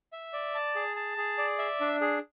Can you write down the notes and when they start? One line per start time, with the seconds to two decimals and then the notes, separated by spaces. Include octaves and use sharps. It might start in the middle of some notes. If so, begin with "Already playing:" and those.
0.13 E5
0.33 D5
0.55 A5
0.75 G#4
0.96 A5
1.17 G#4
1.38 D5
1.59 E5
1.81 D4
2.01 G#4